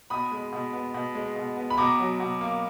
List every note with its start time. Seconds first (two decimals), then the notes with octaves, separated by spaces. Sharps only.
0.10 B2 B5 D#6
0.32 G#3
0.52 B2
0.73 B3
0.94 B2
1.15 G#3
1.36 B2
1.57 B3
1.70 B5
1.78 B2 A#5 D6
1.99 F#3
2.20 B2
2.41 A#3